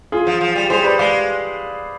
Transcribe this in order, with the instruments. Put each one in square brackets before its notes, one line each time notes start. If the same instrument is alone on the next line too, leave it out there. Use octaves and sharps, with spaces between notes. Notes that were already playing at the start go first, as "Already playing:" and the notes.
[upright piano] F4 G#4
[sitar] F3
F3
G3
[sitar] G3 [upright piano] G#4 C5
[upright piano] B4 D5
[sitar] G#3 [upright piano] D5 F5